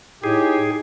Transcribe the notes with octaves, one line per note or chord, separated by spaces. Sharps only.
A2 D#4 G4 G#4